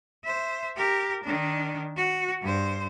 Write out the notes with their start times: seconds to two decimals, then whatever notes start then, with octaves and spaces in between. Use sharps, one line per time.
0.24 C5 E5
0.77 G4 A#4
1.23 D#3 D4
1.97 F#4
2.41 G2 C5